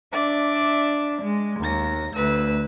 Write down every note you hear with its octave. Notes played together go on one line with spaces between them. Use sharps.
D4 D5 E5
G#3
D#2 A#6
D2 B4 E6